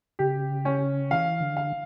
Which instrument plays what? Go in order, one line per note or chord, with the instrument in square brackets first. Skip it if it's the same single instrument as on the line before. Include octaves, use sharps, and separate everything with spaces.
[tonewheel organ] C#3 [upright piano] G4
[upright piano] C#4
[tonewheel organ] E3 [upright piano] F5
[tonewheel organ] D3
[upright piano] F5